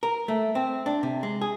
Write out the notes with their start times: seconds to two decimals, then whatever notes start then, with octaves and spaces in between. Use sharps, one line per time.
0.03 A#4
0.28 A3
0.55 C4
0.86 D4
1.03 C3
1.23 G#3
1.41 G#4